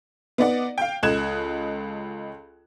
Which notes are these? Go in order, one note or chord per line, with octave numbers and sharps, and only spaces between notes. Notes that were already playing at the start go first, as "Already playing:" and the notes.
B3 D#4 D5 F#5
F5 G5
C#2 A4 D#5 F#6 G#6 E7